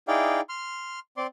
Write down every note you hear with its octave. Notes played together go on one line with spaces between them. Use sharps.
D#4 E4 G#4 D5 F5 G5
C6 F6
C4 D5 C6 D6